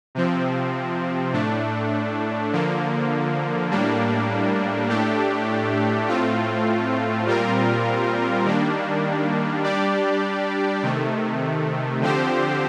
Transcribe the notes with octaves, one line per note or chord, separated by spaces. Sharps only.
C3 F3 C4
A2 A3 D4
D3 F3 A#3
A2 G3 A#3 D4
A2 A3 D4 G4
A2 A3 C4 F4
A#2 G3 C4 F4 A#4
D#3 G3 A#3 D4
G3 D4 G4 D5
C3 D#3 A3
D3 F3 C4 G4 C5